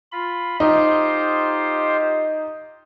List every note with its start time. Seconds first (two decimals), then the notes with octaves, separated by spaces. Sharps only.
0.12 F4 B5
0.60 D#4 F4 G4 C5